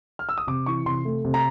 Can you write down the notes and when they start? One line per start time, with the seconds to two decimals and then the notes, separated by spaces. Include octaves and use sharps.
0.19 F6
0.29 E6
0.38 D#6
0.47 C3 D6
0.66 E3 C#6
0.86 C3 C6
1.05 A3
1.25 C3
1.34 A#5